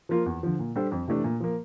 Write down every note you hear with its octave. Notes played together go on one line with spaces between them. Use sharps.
F3 A#3 F4
E2
D3 F3
A#2
G3 D4 A4 C5
F2
C3 E3 A3 D4
A#2
F3 A#3